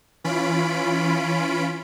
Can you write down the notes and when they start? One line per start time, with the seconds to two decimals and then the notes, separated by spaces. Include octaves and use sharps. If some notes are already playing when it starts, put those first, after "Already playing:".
0.24 E3 C#4 F4 B5 D7